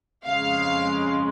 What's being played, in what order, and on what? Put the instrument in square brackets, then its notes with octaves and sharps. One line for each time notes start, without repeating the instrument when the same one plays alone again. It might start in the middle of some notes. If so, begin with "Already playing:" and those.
[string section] F2 C#3 G#3 F5